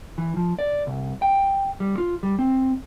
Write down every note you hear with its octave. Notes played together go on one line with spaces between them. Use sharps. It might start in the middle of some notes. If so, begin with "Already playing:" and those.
E3
F3
D5
C2
G5
G3
F4
G3
C4